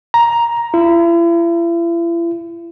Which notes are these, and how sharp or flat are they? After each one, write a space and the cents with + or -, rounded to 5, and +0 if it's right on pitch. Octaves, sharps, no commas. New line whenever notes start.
A#5 +10
E4 +40